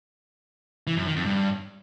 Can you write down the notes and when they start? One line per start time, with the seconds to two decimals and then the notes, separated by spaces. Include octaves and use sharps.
0.87 E3
0.97 F#2
1.07 D#3
1.16 F2
1.26 G2